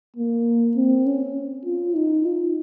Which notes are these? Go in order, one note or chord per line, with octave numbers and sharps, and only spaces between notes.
A#3
C4
C#4
F4
D#4
F4